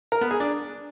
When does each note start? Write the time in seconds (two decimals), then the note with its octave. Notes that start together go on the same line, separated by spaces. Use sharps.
0.12 A#4
0.21 B3
0.31 G#4
0.40 D4